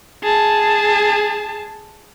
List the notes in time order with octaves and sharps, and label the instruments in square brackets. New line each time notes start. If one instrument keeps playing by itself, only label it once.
[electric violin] G#4 A5